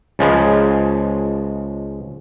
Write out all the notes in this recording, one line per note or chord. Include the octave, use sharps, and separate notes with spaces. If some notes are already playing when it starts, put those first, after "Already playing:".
C#2 C#3 F3 G#3